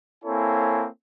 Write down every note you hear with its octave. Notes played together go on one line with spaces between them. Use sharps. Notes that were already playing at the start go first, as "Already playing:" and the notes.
A#3 C4 E4 A4 C#5 G#5